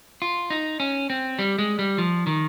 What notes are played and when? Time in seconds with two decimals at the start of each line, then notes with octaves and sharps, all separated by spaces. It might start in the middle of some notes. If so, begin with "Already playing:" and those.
0.22 F4
0.50 D#4
0.80 C#4
1.10 C4
1.39 G3
1.59 G#3
1.79 G3
1.98 F3
2.27 D#3